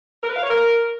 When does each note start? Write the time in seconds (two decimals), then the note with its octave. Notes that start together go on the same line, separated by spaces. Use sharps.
0.23 A#4
0.29 B4
0.36 F5
0.43 C#5
0.50 A#4